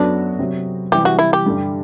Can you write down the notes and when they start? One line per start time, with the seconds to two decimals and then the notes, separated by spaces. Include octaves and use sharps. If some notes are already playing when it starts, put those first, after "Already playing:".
Already playing: F#2 F#3 B3 D4 F#4 A4
0.39 C3 F#3 C4
0.92 C3 E3 G3 G4
1.05 F#4
1.19 E4
1.33 G4
1.46 G2 D3 G3